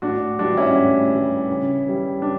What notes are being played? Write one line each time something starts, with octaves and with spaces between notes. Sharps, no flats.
A2 D4 F#4
E3 G3 D4 F#4
C#4 E4
A2
E3 G3
C#3
E3 G3
C#3 D4